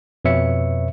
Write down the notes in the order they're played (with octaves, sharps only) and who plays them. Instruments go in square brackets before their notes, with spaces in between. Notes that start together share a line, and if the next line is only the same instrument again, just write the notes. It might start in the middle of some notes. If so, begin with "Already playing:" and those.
[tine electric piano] F2 B2 B4 C#5 E5 C#7